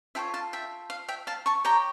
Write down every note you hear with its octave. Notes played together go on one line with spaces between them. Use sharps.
F4 A4 C#5 E5 G5
F5 A5
E5 G5
F5
E5 G5
F5 A5
A5 C#6
G4 C#5 G5 A#5